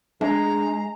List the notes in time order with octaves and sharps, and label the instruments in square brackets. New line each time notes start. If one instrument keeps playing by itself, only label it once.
[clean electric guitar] G#3 [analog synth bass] D4 [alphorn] G#4 [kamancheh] A#5